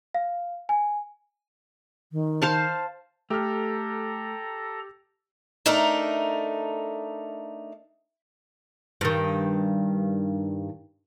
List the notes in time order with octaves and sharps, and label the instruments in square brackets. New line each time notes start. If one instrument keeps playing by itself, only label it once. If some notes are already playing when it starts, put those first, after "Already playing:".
[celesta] F5
G#5
[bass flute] D#3
[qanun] C5 F5 A5
[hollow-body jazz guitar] A3 [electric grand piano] G4 F6 [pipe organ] A4 A#5
[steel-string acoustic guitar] A3 D4 D#4 A4 A#4
[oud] G2 D#3